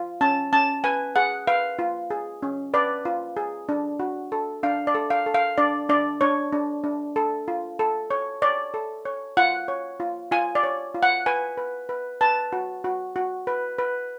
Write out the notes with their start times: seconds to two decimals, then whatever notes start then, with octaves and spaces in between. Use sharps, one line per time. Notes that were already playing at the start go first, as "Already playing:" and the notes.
Already playing: F4
0.21 C#4 A5
0.53 C#4 A5
0.84 B4 G#5
1.16 G#4 F#5
1.47 B4 F5
1.79 F4
2.10 G#4
2.43 C#4
2.74 B4 D5
3.05 F4
3.37 G#4
3.69 D4
4.00 F#4
4.32 A4
4.63 D4 F5
4.87 D5
4.95 A4
5.10 F5
5.26 A4
5.34 F5
5.58 D4 D5
5.89 D4 D5
6.21 D4 C#5
6.52 D4
6.84 D4
7.16 A4
7.48 F4
7.79 A4
8.11 C#5
8.42 C#5 D5
8.74 A4
9.05 C#5
9.37 F4 F#5
9.68 C#5
10.00 F4
10.31 F4 G#5
10.55 D5
10.63 C#5
10.95 F4
11.03 F#5
11.26 B4 G#5
11.58 B4
11.89 B4
12.21 B4 A5
12.53 F#4
12.84 F#4
13.16 F#4
13.47 B4
13.78 B4